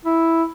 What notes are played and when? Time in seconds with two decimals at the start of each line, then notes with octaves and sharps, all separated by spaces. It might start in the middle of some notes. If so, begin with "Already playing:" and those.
0.05 E4